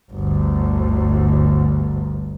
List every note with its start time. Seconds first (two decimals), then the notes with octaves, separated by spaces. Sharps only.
0.11 G1 D2